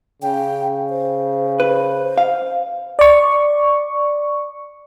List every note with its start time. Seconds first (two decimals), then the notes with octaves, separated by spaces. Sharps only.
0.22 C#3 G5
0.90 C5
1.60 B4 C5
2.18 F5
2.99 D5 C#6